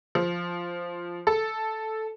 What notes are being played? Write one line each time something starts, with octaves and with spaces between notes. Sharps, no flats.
F3
A4